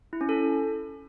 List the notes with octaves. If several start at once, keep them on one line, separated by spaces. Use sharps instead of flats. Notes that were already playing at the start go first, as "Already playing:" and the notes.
E4
C#4
A4